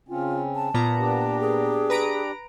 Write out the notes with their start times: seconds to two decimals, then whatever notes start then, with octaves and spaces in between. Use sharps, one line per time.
0.09 C#3 C4 C#4 F4
0.55 A5
0.74 A#2 B3 A#5
0.98 D4 G4
1.41 G#4
1.90 B4 A#5 D7